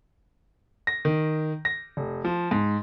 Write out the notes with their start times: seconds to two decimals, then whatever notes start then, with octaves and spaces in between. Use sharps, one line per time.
0.87 A#6
1.05 D#3
1.65 A#6
1.97 F1
2.25 F3
2.51 G#2